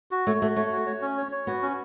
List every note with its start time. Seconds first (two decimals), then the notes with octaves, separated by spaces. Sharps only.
0.11 F#4
0.27 A3 C#5
0.41 A3 F#4
0.56 A3 C#5
0.72 F#4
0.86 C#5
1.02 C#4
1.17 C#5
1.32 C#5
1.47 B3 F#4
1.62 C#4